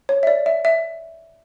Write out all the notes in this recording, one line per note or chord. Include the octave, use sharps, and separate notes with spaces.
C#5
E5
D5
E5
E5